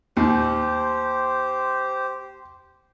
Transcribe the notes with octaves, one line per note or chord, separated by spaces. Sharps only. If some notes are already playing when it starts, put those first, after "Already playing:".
D#2 G4 C5